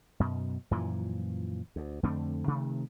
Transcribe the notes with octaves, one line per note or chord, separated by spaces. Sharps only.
F#2 B2
F#2 A#2 E3 F3
D2
F2 D3 A3 C4
C3 D#3 A3